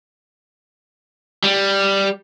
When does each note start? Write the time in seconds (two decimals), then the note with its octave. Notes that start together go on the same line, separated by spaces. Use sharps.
1.44 G3